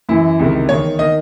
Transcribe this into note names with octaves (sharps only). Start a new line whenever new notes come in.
F#2 E3 E4
C#2 C3 D#3
E2 D#3 C#5
D#3 D#5